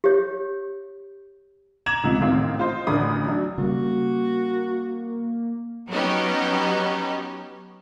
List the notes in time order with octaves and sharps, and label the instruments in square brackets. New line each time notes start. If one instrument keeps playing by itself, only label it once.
[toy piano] G4 C#5
[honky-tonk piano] A#5 D6 G#6 E7 F#7
C#2 G#2 C3 F3 G#3
A1 D#3 C4 F5
F4 C5 D#5
A1 D2 D4 A#4 B5 D#6
F#3 D4 F#4
[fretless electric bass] C#3 G3 [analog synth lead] A#3 [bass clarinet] F#4
[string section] F#3 B3 C#4 D#4 G4